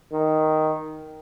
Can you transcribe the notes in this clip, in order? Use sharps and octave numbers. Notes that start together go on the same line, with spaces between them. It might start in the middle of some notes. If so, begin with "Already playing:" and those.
D#3